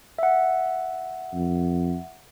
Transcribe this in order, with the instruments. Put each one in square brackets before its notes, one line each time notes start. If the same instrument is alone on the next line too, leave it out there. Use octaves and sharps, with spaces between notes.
[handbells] E5 F#5
[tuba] F2